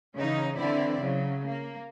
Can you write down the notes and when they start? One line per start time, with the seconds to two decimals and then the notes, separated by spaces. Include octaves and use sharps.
0.17 C#3 E3 C#4 D#4
0.56 D3 E3 C4 E4 D5
1.01 C#3 F#3
1.47 A#3